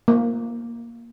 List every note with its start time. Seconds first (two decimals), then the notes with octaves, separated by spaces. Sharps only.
0.08 A#3